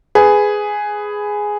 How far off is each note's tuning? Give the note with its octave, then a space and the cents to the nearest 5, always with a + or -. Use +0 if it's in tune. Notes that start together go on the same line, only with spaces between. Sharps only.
G#4 +0 B4 +15